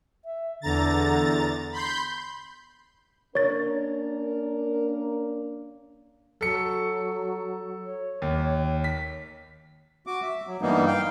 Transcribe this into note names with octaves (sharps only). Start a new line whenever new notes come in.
E5
E2 D3 A#5 A6
B5 C6 G6
A#3 C#4 D4 A#4 C#5 A6
F#3 A4 C#7
C#5
D#2
B6
F#4 D6
E5
F#3
G2 E3 G3 A#3 B3 D#4
F5 G5